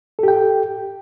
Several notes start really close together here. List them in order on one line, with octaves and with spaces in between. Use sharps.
A4 G4 G5